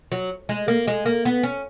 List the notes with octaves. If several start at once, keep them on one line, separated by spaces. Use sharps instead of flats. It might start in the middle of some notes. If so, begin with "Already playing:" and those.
F#3
G#3
A#3
G#3
A#3
B3
C#4